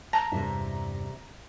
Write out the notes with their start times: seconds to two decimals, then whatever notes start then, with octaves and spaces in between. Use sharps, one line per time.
0.13 A5 A#5
0.32 E2 G2 C3 G3 D4 E5